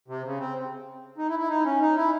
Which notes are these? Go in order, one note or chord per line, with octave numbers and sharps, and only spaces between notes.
C3
C#3
C4
D#4
E4
E4
D#4
C#4
D#4
E4